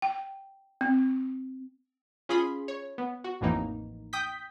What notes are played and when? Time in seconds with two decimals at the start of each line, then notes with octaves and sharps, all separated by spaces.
0.02 G5
0.81 C4
2.29 C#4 F4 G#4 B5 C6
2.68 C#5
2.98 B3
3.24 F#4
3.41 A1 F2 A2 E3 A#3 D#4
4.13 G5 D#6 G6 B6